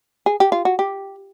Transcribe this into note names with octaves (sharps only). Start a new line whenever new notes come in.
G#4
G4
F4
F#4
G4